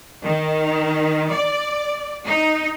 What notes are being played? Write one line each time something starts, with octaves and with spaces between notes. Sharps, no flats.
D#3
D5
D#4